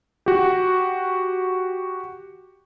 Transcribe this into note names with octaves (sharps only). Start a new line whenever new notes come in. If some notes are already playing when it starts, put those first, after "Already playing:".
F#4 G4